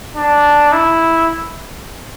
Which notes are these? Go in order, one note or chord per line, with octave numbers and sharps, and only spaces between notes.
D4
E4